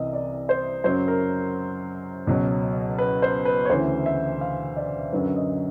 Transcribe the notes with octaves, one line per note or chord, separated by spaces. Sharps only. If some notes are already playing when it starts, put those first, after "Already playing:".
Already playing: C2 C3 E3 D#5
D5
C5
F#2 C#3 F#3 C5
A#4
C#2 B2 F#3
B4
C5
B4
C#5
D2 C#3 E3 C5
E5
F5
D5
F#2 D3 F#3 B4
D#5